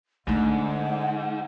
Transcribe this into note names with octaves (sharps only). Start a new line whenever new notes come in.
G#2 D3 A3 D#4 F#5